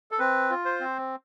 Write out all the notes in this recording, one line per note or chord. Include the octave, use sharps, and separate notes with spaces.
A4
C4 B4
F4
C5
C4